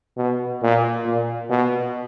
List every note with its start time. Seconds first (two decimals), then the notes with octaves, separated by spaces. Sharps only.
0.17 B2
0.62 A#2
1.05 A#2
1.50 B2